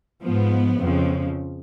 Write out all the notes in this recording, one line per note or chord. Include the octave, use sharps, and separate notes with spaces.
G#2 F3 B3
F2 C#3 F3